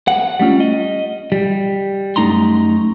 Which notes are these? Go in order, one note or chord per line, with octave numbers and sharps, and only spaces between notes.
F#5
G3 A3 C#4 F4
D#5
G3
F#2 A3 D#4 A#5 C6